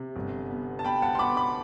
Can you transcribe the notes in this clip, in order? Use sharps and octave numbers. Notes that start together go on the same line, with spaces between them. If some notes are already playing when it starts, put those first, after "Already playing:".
Already playing: C3
G1
B3
A5
B3 G5 B5
F#5 A5
C6
B3 B5 D6
B5 D6